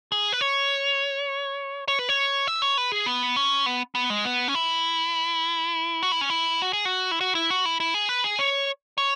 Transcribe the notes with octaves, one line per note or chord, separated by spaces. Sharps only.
G#4
B4
C#5
C#5
B4
C#5
E5
C#5
B4
G#4
B3
C#4
B3
B3
G#3
B3
C#4
E4
F#4
E4
C#4
E4
F#4
G#4
F#4
E4
F#4
E4
F#4
E4
E4
G#4
B4
G#4
C#5
C#5